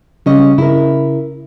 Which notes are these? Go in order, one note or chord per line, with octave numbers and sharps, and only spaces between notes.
C#3 G3 C#4 D#5
C#3 E4 A#4